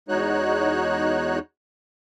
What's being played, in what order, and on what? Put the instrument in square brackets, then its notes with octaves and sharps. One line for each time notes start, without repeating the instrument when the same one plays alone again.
[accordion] E2 G#3 D#4 F#4 C#5 F#6